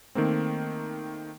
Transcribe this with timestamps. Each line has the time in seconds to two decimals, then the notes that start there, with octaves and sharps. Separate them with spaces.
0.15 D#3 A3 A#3 C4